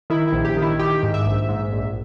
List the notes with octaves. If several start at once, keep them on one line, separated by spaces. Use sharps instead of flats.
D#3 E4
A#1 E4
G4
D#3
E4
D#3 G4
G#2
E5
A#1
G#2
A#1